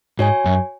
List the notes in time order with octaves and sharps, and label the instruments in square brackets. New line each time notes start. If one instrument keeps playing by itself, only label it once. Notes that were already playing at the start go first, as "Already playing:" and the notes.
[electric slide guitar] G#2 [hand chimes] F#4 C#5 G#5
[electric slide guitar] F#2